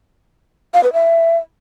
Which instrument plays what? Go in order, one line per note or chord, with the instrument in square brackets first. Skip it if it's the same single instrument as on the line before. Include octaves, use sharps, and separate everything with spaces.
[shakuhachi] F5
B4
E5